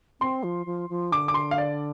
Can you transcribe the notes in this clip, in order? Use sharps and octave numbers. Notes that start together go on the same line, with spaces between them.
C4 C6
F3
F3
F3
D3 D6
D6
C6
F5
D5